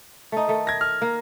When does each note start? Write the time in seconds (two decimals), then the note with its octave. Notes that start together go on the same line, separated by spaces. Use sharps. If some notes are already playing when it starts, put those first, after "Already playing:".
0.32 A3 D#4
0.48 D#3 A3
0.67 G#6 A#6
0.81 F6
1.02 A#3